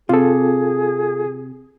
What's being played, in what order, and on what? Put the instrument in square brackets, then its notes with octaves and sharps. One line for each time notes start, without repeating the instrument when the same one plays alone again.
[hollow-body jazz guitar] C3 [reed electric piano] F4 A4 [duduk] G#4